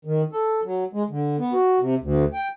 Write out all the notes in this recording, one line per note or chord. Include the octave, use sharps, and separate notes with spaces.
D#3
A4
F#3
G#3
D3
B3
F#4
C3
D2
G5